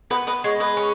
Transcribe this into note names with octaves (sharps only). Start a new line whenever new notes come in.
B3 B4 D#5
B4 D#5
G#3 C#5
B4 D#5
C#4